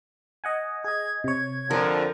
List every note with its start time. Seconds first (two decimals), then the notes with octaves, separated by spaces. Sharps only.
0.44 D#5 F#5 G#5
0.84 G#4 D#5 G#6
1.24 C3 C#5 G#6
1.71 F2 D3 F3 A#4